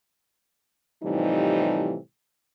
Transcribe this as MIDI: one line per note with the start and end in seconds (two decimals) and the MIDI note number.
1.04 1.97 45
1.04 1.97 48
1.04 1.97 52
1.04 1.97 53
1.04 1.97 55
1.04 1.97 63